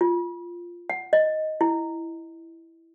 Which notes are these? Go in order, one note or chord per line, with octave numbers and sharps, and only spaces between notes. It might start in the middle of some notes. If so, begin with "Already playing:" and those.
F4
F#5
D#5
E4